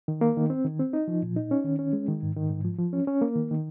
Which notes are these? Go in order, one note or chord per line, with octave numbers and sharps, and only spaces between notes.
D#3
A#3
D#3
C4
D#3
C4
D#4
F3
A#2
D#4
C#4
D#3
C#4
G#3
D#3
G#2
D#3
G#2
F3
F3
C#4
C#4
A#3
D#3
D#3